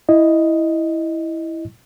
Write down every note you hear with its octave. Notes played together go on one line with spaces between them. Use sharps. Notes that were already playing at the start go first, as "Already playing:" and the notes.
E4 D#5